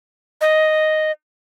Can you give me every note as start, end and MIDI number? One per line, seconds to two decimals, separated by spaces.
0.41 1.11 75